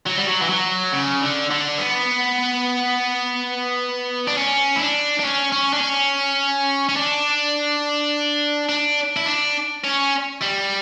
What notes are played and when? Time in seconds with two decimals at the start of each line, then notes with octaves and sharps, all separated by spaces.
0.06 F#3
0.17 G3
0.26 F#3
0.42 E3
0.50 F#3
0.93 C#3
1.21 D3
1.51 D3
1.78 B3
4.28 D4
4.37 C#4
4.76 E4
4.80 D4
5.19 D4
5.24 C#4
5.52 C#4
5.73 D4
5.81 C#4
6.89 C#4
6.96 D4
8.69 D4
9.16 E4
9.26 D4
9.84 C#4
10.41 G3